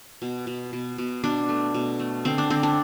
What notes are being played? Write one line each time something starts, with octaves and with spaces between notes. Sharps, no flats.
B2
B2
B2
B2
B2 D4
A3
B2
A3
D3 C4
D4
D3 C4
D4